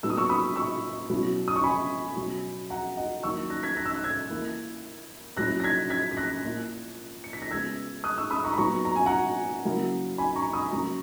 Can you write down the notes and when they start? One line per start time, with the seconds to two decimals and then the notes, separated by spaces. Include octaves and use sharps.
0.03 A#2 F#3 B3 D#4 E6
0.10 D#6
0.17 C#6 E6
0.29 B5 D#6
0.56 C#6 E6
1.10 B2 F#3 C#4 E4
1.48 D#6
1.56 C#6
1.64 G#5 B5
2.16 B2 F#3 C#4
2.70 F#5 A#5
2.97 D#5 F#5
3.23 D#3 F#3 A#3 E4 C#6 E6
3.50 F#6 A#6
3.63 G#6 B6
3.77 F#6 A#6
3.85 E6
3.95 F#6
4.04 E6 G#6
4.30 E3 A#3 E4
5.37 A#2 F#3 C#4 E4 F#6 A#6
5.60 A#6
5.64 G#6 B6
5.90 G#6 B6
6.11 B6
6.17 F#6 A#6
6.44 A#2 A#3 E4
7.24 C#7
7.33 B6
7.42 A#6
7.51 C#3 G#3 B3 E6 G#6
8.04 D#6 F#6
8.18 C#6 E6
8.30 B5 D#6
8.44 A#5 C#6
8.53 B5
8.57 A#2 F#3 B3 D#4 A#5 C#6
8.85 A#5
8.96 G#5
9.06 F#5 A#5
9.65 C#3 F#3 A#3 E4
10.18 G#5 B5
10.36 A#5 C#6
10.53 B5 D#6
10.72 C#3 F#3 A#3 C#4 A#5 C#6